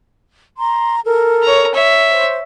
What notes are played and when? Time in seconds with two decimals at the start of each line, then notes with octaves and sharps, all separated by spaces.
0.56 A#5 C6
1.03 A4 A#4
1.43 C#5 A#5
1.74 C#5 E5
2.08 C5